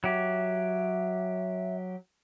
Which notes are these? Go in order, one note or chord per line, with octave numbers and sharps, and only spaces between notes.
F#3 G4 E5